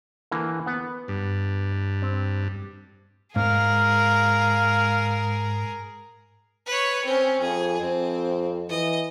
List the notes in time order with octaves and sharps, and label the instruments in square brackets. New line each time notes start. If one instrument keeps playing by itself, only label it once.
[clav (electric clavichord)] D3 E3 A#3
B3 F#5
[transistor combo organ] G2
[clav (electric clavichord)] C4
[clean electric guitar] G#2 [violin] G#4 A#4 [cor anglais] F5
[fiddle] B4 C#5
C4 C#4
[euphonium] F2 [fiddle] G#4
[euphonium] F2 [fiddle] C4
[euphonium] E3 [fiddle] D#5